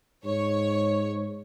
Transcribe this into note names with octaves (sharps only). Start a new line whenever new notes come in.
G#2 C#5